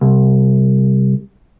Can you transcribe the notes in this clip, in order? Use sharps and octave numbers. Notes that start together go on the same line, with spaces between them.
C2